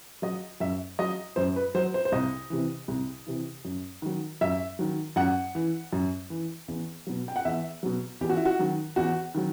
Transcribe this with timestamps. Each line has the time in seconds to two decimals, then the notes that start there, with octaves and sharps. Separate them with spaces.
0.22 F#3 D#5
0.60 F#2 E5
0.99 F#3 D#5
1.36 F#2 C5
1.56 B4
1.75 F#3 C5
1.94 C5
2.05 C5
2.12 C2 D#5
2.50 C3 E3
2.88 C2
3.27 C3 E3
3.65 F#2
4.02 D#3 F#3
4.41 F#2 E5
4.79 D#3 F#3
5.16 F#2 F#5
5.55 E3
5.93 F#2
6.30 E3
6.68 E2
7.07 B2 F#3
7.28 G5
7.36 F#5
7.45 E2 E5
7.83 B2 F#3
8.21 E2 G4
8.30 F#4
8.36 E4
8.45 F#4
8.59 D#3 F#3
8.96 E2 F#4
9.35 D#3 F#3